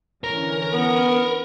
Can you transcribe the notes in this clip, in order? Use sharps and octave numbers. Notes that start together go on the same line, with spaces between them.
D3 E3 C#4 A#4
B3